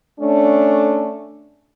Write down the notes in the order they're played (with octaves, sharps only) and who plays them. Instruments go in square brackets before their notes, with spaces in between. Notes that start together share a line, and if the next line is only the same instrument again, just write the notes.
[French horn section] A3 C#4 D4